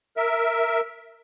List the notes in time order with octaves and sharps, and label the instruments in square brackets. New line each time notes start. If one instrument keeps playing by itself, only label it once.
[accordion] A#4 E5